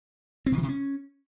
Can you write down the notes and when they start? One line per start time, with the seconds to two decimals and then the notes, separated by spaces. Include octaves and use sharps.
0.46 C4
0.52 C3
0.57 D#3
0.63 C3
0.68 C#4